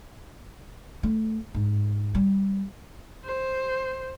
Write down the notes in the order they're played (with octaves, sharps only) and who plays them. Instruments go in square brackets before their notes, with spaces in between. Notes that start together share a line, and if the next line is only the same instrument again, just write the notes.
[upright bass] A3
G#2
G3
[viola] C5